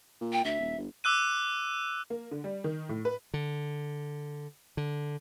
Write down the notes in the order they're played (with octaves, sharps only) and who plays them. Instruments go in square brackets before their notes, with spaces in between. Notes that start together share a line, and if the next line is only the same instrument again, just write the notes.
[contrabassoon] A#2
[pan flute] G5
[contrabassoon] D2 [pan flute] E5
[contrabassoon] D#1
G1
[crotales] D6 E6 F#6 D#7
[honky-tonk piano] A#3
D3
G3
D#3
A2
B4
[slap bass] D3
D3